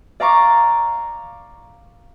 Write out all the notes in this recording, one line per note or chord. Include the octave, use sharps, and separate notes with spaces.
D5 F5 A#5 C#6 D6